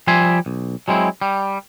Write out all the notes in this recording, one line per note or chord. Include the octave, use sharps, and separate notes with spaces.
F3 G3 E5 G#5 C6
B1
F#3 G#3 C4 E4
G3